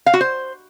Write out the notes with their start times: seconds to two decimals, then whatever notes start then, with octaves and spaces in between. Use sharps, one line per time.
0.06 F5
0.14 F#4
0.21 C5